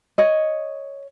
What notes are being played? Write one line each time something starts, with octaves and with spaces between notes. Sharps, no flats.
C#5 D#5